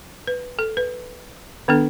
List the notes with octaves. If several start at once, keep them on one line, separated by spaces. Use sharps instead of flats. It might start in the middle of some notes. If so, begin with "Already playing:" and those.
B4
A4
B4
D#3 B3 D4 A4